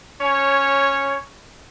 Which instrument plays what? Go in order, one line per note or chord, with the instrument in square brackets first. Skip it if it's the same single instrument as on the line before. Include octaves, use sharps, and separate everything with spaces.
[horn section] C#4 C#5